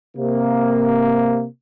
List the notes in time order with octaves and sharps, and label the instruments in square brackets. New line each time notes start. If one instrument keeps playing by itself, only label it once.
[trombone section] C3 A#3